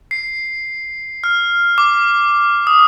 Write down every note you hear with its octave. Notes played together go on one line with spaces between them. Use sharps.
C7
F6
D6
D#6